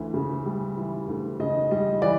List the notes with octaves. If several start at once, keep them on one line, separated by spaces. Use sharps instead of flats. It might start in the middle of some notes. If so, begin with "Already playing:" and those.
Already playing: D2 E3
C#3
G3
E3
D2
C#3 D#5
G3 D#5
E3 D5